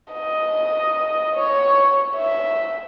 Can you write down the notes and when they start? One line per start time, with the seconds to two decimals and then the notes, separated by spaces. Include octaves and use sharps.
0.14 D#5
1.36 C#5
2.16 E5